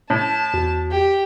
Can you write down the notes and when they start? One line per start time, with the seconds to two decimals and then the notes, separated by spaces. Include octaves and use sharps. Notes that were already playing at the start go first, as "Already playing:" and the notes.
0.10 A2 A5
0.54 E2 F#4
0.91 G4